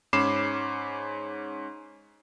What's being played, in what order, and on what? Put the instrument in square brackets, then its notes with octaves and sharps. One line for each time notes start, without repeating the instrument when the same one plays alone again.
[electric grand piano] G#2 C#4 B5 D6 C7 E7